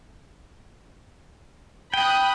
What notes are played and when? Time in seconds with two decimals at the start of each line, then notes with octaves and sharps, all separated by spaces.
1.94 G5 B5 D#6 F#6